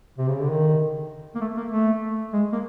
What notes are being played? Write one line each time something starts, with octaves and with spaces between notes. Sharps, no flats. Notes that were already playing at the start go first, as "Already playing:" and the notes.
C3
C#3
D3
D#3
A#3
A3
A#3
A3
G#3
A#3